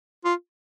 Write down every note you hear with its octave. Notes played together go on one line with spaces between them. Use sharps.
F4